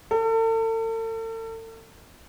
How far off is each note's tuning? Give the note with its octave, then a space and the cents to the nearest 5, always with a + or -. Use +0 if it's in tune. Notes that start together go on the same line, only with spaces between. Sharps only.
A4 +40